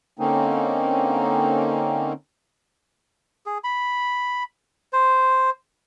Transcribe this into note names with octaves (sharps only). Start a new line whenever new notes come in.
D3 A#3 C4 C#4 D#4
G#4
B5
C5